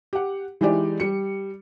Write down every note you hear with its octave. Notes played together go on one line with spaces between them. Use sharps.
G4 F#5
E3 G#3 D#4 E4 G4 D5
G3 C#7